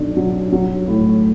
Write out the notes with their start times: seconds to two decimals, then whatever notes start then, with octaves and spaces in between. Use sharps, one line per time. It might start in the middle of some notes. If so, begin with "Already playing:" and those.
Already playing: B1 B2 D4
0.17 F#3
0.52 F#3
0.88 A2